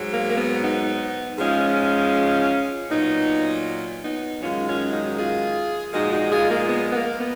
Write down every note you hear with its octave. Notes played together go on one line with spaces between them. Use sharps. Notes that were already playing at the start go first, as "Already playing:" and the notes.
Already playing: G#2 F#3
A#3
A#3
B3
B3 D#4
G#2 F3 G#3 C#4 F4
A#2 F#3 B3 D#4
B3 D#4
F#2 D#3 G#3 C#4 F4
C#4 F4
D#4 F#4
F4 G#4
A#2 F3 G#3 D#4 F#4
D#4 F#4
F4 G#4
A#3
B3
B3
A#3
B3